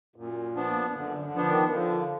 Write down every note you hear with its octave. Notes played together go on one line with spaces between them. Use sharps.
F#2 A#2
F3 B3 D4
F#2 D3
D3
F3 B3 D4
D#3
D3 F3